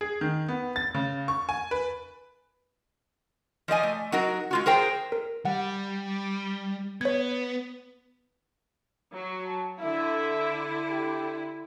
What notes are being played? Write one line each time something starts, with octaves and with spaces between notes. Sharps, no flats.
G#4
D#3
B3
A6
C#3
C#6
G#5
B4
F3 D5 D#5 G#5
A3
F#3 D#4 F#4 A#4
G#3 F4 F#4
G#4 A#4 C5 G5
A#4
G3 F#5
B3 C#5 G#6
F#3
A5
D3 E4 E5
G4